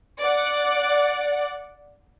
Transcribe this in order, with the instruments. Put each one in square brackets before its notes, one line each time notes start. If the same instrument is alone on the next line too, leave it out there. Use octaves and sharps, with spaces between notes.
[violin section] D5 F#5